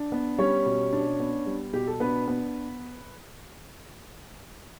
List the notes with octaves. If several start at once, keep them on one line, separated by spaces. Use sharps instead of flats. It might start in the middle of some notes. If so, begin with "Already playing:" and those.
Already playing: D4
B3
G3 C#4 C#5
B2
D4
B3
G3
B2 G4
A4
B3 D4 B4
B3